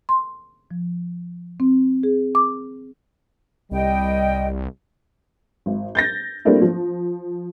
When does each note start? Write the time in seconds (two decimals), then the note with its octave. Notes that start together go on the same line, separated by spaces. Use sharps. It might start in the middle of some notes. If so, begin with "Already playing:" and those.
0.09 C6
0.71 F3
1.60 C4
2.03 G#4
2.35 D6
3.71 C2 G3 D#5 G5
5.66 G#1
5.95 G6 A6 A#6
6.45 G3 A3 A#3 C4 D4 E4
6.62 F3